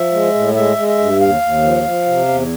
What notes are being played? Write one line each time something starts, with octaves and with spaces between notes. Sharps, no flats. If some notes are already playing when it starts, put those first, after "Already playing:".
Already playing: F3 E5
G#3
A2
G#3 E5
G#3
E5
G2
D#2 F5
D#2
F3
F3
C3
E2